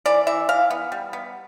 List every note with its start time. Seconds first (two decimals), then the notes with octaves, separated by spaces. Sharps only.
0.06 E3 D5
0.27 E3 E5
0.49 E3 F5
0.70 B3
0.92 G3
1.13 B3